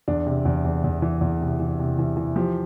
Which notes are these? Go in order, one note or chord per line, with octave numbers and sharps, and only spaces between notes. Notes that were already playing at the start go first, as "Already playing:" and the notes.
E2 D4
C3
E2
E2
E2
E3
E2
C3
E3
C3
E3
E3
F3 G4